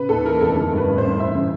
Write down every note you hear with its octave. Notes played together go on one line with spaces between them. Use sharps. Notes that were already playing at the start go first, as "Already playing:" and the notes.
Already playing: C#3 B4
D#2 A4
E3 A#4
F1 A4
D3 A#4
G2
B4
A1
C5
A1
E3 E5
C#3